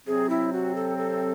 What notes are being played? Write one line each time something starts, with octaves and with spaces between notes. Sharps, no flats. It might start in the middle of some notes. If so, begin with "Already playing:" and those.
C3 F#3 C4 G#4
E4
F#4
A4
A4